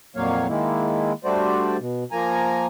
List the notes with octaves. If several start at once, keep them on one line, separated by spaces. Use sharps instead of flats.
F2 A#2 F#3 A#3 C#5 F5
D#3 G#3 A#3 E4
G3 A3 D4 F#4 C5 D5
B2
F3 A#3 G#5 A#5